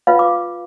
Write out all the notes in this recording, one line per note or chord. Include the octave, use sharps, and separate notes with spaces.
F4 B4 F5
D6